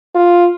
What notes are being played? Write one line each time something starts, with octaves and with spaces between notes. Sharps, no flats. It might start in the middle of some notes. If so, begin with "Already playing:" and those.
F4